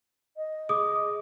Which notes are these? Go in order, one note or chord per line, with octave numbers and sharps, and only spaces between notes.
D#5
G#4 D6 D#6